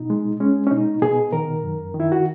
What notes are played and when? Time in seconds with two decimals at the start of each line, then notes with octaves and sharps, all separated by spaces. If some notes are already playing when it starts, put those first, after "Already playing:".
Already playing: B2 D#4
0.10 G#3
0.40 G#3 C#4
0.67 C#4
0.71 B2 D#4
1.02 B2 G#4
1.33 D#3 A#4
1.64 F#2
1.94 D#3
2.00 E4
2.12 F#4